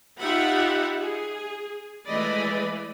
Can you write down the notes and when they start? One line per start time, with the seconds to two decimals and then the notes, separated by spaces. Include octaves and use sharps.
0.17 D#4 F4 G4 E5 F#5 B5
0.97 G#4
2.08 E3 G#3 A3 D5 D#5 B5